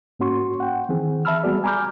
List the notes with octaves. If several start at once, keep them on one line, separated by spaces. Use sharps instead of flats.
G#2 A#3 C#4 F#4 C6 C#6
F#5 G5
D#3 E3 C4 G#4
E5 A5 B5 E6 F6
G3 G#3 B3 F#4 G#4 D5
G#5 A#5 B5 D6 F6 G6